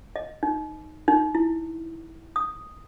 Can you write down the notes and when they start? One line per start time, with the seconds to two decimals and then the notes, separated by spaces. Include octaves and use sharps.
0.16 D#5
0.43 D#4
1.08 D#4
1.35 E4
2.36 D#6